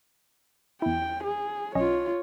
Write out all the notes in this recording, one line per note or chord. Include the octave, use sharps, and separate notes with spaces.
E2 E4 G5
G#4
B1 C#4 F4 C#5 D#5